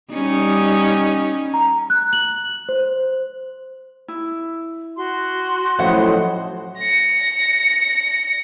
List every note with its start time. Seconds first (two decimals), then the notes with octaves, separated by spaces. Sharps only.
0.12 G3 C#4 D#4
1.54 A#5
1.90 F#6
2.13 F#7
2.69 C5
4.08 E4
4.97 F#4 C6
5.79 A2 F3 F#3 C#4 C5 D#5 F#5
6.78 A#6 C#7